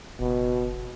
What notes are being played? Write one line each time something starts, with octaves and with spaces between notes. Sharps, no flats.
F#1 B2